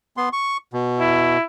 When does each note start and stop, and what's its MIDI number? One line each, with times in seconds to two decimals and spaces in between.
0.17 0.29 59
0.17 0.29 84
0.33 0.57 85
0.73 1.38 47
1.00 1.43 64